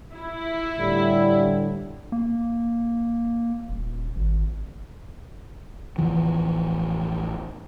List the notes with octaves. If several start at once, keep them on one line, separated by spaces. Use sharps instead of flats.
E4
A2 D3 G3
A#3
D#1
G#1
A1 E2 E3 F3